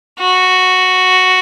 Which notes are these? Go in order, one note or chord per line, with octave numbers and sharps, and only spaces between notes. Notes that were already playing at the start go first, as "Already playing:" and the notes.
F#4